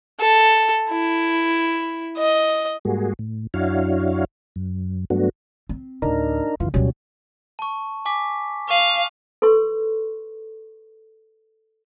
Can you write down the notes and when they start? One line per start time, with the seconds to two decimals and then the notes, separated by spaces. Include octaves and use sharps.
0.20 A4
0.90 E4
2.17 D#5
2.85 G#2 G3 A#3 F#4 G#4
3.19 A2
3.54 F#2 D4 E4 F#4 C#5 F5
4.56 F#2
5.10 G2 F#3 A3 B3 D4 F#4
5.69 C4
6.02 D2 A2 D4 D#4 A#4
6.60 F#2 D3 E3 F4
6.74 D2 B2 F#3 G3 C#4
7.59 A5 C#6
8.06 G#5 D6 B6
8.69 F5 C#6 D#7 F#7
9.42 A4 B4 C6 C#6